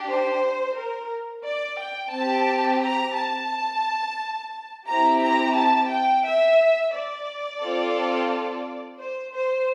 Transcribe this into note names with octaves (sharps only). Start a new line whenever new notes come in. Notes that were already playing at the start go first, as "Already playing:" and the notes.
Already playing: D4 G4
C5
A#4
D5
G5
C4 G4 A5
A#5
A5
C4 E4 G4 A#5
A#5
A5
G5
E5
D5
C4 F4 A4
C5
C5